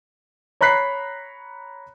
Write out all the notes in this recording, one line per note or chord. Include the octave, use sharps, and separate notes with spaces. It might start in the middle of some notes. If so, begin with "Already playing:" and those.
C#5 A#5 B5 F#6 B6 C7